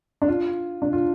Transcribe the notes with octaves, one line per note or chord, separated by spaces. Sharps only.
D4
F4
D4
F4